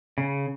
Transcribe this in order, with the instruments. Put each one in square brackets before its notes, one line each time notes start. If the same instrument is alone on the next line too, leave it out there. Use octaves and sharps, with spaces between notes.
[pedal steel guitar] C#3